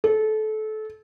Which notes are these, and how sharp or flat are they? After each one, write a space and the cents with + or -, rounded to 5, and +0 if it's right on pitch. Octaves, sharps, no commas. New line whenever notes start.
A4 -25